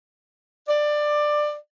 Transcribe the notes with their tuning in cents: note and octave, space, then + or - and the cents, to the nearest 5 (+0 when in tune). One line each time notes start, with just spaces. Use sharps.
D5 +15